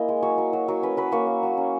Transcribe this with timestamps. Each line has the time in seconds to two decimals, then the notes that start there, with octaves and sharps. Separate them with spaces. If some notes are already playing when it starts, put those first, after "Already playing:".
Already playing: A#3 C#4 E4 D#5
0.09 G#3
0.22 F#3 C#5
0.38 F#3
0.53 F#3
0.68 F#3
0.83 C#4 B4
0.97 F#3 B4
1.12 A#3 C#5
1.27 A#3
1.43 F#3
1.57 C#4